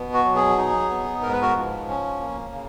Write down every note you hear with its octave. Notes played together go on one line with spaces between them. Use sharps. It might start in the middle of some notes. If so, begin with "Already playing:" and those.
Already playing: B2 B3
F#4
F#3
G#4
D#4
B3
G#2 A#4
B4
F#4 A#4
F3
C#4
A#3
C#3